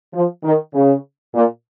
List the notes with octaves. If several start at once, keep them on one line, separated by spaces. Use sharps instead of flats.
F3
D#3
C#3
A#2